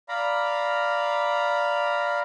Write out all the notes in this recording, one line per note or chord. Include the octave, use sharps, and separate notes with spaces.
D5 F5 A#5 B5